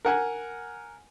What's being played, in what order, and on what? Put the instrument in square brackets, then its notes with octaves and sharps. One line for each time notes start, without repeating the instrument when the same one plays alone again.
[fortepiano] A#4 F#5 G#5